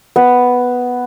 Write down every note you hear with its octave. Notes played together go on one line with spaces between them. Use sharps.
B3